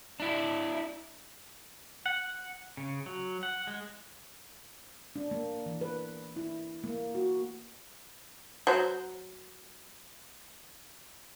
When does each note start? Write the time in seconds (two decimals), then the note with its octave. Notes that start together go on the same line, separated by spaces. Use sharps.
0.20 D4 E4
2.06 F#5
2.77 C#3
3.06 F#3
3.43 F#5
3.67 G#3
5.16 D4
5.31 A#3
5.66 E3
5.81 B4
6.36 E4
6.84 A#3
7.15 F#4
8.67 F#3 C5